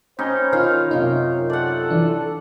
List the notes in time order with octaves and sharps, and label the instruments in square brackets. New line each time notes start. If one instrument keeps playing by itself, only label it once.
[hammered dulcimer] C#4 D#4 G4 [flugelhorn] C5 [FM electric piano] B5 G6
[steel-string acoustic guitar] D#3 D#4 F4 [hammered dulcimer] F5
[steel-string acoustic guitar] F#2 C3 F4 [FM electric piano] D#4 [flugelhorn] A#4
[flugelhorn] A4 [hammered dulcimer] D5 F#5
[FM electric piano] E3 D4